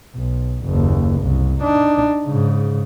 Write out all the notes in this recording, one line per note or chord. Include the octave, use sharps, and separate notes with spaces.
B1
F#1 D#2
C2
D4 D#4
G#2 C#3